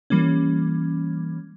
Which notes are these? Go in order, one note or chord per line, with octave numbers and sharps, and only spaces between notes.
E3 G3 A#3 C#4